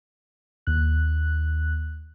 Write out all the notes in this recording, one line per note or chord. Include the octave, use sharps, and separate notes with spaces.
D#2 F#6